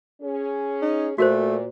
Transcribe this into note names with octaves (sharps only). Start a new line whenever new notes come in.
C#4 G#4
D#4
A#2 A3 F#4 A#4 C5